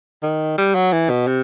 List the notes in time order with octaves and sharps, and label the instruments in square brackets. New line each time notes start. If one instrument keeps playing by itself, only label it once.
[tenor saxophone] D#3
G3
F#3
E3
B2
C3